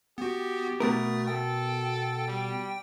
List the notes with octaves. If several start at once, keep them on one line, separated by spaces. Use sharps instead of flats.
B3 F#4 G4
B2 A3 A#4 D#6 A6
A4 G5
G3